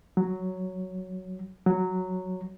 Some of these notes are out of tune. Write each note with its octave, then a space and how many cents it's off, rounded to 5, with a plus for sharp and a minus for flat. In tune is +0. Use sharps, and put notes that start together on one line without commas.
F#3 +5
F#3 +0